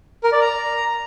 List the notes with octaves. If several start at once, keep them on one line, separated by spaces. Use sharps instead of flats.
A#4
D5
A#5